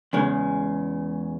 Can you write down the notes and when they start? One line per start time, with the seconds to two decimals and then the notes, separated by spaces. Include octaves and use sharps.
0.13 E2 C#3 G#3